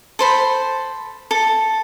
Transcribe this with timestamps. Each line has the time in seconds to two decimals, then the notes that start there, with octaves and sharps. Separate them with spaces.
0.19 A4 C5 B5
1.31 A4